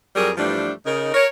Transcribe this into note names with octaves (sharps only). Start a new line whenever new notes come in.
F2 F#3 G3 G#4 A#4
G2 E3 F3 G3 A3 D4
C#3 D#4 A#4
A#4 C#5